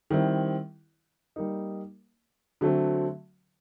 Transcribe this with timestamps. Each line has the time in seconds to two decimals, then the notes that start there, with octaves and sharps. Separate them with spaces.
0.10 D#3 G3 C4 E4
1.36 G3 A#3 D#4
2.61 D3 F#3 A3 C4